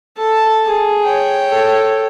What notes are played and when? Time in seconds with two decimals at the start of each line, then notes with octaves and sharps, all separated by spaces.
0.17 A4 A5
0.67 G#4
1.04 C#5 G5
1.48 A4